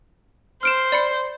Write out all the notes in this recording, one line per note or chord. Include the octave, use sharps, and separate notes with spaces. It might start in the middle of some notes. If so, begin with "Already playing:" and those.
C5 F6 D7 E7
D5 B5 C#7